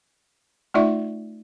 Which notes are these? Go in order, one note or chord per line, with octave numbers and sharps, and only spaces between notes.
A3 D#4 F4 D5 E5 C#6